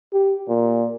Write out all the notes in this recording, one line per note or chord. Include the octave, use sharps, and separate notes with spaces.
G4
A#2